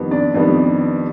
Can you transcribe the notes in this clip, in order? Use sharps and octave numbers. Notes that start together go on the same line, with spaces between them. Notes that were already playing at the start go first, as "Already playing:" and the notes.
Already playing: F2 D#3 G3 B3
D4 D5
F2 D#3 G3 B3